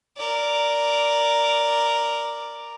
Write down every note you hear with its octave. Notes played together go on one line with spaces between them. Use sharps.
A#4 D5